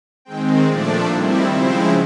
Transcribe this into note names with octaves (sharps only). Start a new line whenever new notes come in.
D#3 G#3 C4 G5
A#2 F3 A3 D4 D5
D#3 G3 C4 E4
C#3 F3 G#3 C4 E4 C5